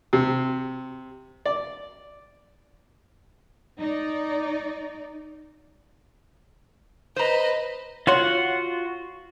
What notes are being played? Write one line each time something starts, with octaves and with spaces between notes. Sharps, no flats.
C3
D5
D#4 D5
B4 C5 D#5 A#5
F4 F#4 C#5 F#5 C6